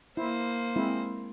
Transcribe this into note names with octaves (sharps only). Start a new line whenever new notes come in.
A#3 E4 C5
G#3 C4 E4